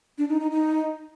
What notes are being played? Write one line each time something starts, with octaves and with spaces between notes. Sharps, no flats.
D4
D#4
D#4
D#4